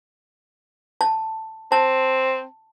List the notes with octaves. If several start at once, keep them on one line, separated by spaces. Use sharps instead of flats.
A5
C4 A5